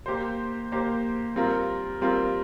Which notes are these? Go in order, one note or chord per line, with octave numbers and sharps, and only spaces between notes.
A#3 G4 C5
A#3 G4 C5
G3 C4 F4 A#4
G3 C4 F4 A#4